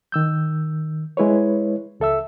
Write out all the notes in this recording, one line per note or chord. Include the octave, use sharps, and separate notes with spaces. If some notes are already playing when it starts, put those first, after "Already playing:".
D#3 E6 G6
G#3 E4 B4 C#5
C#2 A4 E5 E6